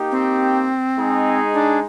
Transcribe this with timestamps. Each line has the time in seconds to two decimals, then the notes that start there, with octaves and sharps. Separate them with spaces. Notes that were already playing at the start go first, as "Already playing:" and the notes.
Already playing: A#3 D#4 G4
0.11 C4
0.96 G#3 D#4 G#4
1.54 D4